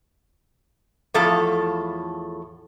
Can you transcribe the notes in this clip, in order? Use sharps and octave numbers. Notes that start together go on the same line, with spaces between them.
E2 A2 F3 A4 F5 A5